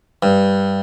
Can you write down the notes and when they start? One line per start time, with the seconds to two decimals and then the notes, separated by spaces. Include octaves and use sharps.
0.23 G2